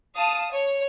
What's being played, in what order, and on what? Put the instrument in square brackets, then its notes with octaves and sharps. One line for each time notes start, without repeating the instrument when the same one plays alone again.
[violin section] F5 A5 D#6
C#5